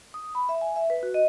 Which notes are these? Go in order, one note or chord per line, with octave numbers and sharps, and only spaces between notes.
D#6
B5
E5
G#5
E5
B4
F#4
D#5